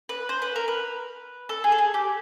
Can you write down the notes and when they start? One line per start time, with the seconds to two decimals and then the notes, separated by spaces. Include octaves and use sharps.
0.09 B4
0.29 C5
0.42 B4
0.56 A#4
0.68 B4
1.49 A4
1.64 G#4
1.72 A4
1.78 G#4
1.94 G4